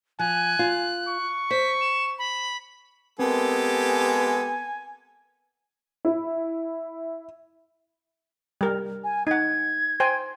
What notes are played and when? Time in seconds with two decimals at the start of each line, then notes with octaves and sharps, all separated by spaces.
0.19 F3 G#5 F#6
0.59 F4
1.08 C#6
1.51 C5 B6
1.81 E7
2.19 B5
3.19 G#3 B3 C4 G4 A4 A#4 G#5
6.05 E4
8.61 G3 A#4
9.04 G#5
9.27 D#4 F#5 G#6
10.00 C5 G5 G#5